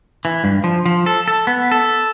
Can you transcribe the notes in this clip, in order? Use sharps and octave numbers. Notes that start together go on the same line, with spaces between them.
E3
G2
F3
F3
A4
A4
B3
A4